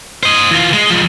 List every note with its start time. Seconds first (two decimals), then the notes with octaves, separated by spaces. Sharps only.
0.23 C5 D#5
0.51 E3 F4
0.73 G#3
0.90 F3 G#3